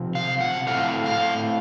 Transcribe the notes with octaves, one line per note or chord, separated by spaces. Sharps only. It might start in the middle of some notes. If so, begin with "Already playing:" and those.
Already playing: C3 F3 C4
F5
F#5
A2 A3 C4 F5
F5